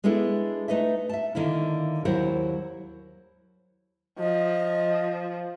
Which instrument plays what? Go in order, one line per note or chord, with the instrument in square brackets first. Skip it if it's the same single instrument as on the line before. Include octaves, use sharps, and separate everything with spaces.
[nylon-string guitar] G#3 B3 D4 E4 A4
A3 D#4 B4 D#5 E5
E5 A5
D3 D#3 A#3 E4
D#2 F#3 E4 A#4 C5 F#5
[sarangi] F3 [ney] D#5